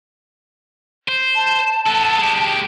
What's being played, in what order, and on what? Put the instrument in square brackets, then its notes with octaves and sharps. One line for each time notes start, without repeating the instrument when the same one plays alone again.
[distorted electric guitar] C5
[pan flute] A5
[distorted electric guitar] B3 A4
G#3 G4